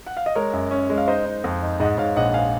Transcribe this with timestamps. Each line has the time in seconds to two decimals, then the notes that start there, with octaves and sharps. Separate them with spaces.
0.06 F#5
0.17 F5
0.26 D#5
0.35 G#3 A#4 C#5
0.53 F#2
0.71 C#4
0.90 G#3
0.97 F5
1.08 D#4 C5 D#5
1.25 D#4
1.44 F2
1.62 D#4
1.80 G#2 D#5 F#5
1.98 G#2 C#5 F5
2.17 A#1 D#5 F#5
2.34 F5 G#5